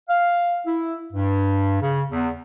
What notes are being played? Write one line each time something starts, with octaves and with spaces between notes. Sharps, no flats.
F5
E4
G2
C#3
E2